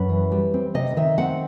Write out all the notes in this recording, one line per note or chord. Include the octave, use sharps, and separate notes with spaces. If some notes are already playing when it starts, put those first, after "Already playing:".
Already playing: F#2 B4
E3
G3
C4
C3 D#5
D#3 E5
C4 F#5